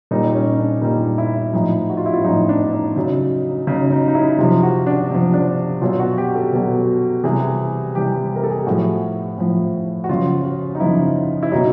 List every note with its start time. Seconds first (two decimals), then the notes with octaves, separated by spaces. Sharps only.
0.11 A#2 G3 D#4
0.34 C#4
0.59 D4
0.82 A#2 G3 D#4
1.18 E4
1.53 A2 F3 D#4
1.89 F#4
1.97 F4
2.06 E4
2.14 F4
2.24 A2 F3 D#4
2.49 D4
2.73 D#4
2.96 C#3 F#3
3.67 C#3 F#3 D#4
3.91 D#4
4.08 D#4
4.15 E4
4.38 C3 F3 F4
4.63 F#4
4.86 D4
5.10 C3 F3
5.34 D4
5.81 B2 F#3 F4
5.99 F#4
6.18 G4
6.35 A4
6.53 B2 F#3
7.24 C3 E3 G3 G#4
7.95 C3 E3 G3 G4
8.36 A#4
8.43 A4
8.51 G#4
8.59 G4
8.67 A2 F3 F#4
9.38 A2 F3
10.04 F#4
10.09 C#3 F3 F4
10.45 F#4
10.75 D#4
10.80 C#3 F3 E4
11.43 E4
11.52 B2 F#3 D#4